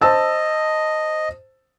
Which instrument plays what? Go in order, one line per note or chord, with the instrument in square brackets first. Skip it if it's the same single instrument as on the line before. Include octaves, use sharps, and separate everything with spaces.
[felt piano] C5 A5 E6 [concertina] D#5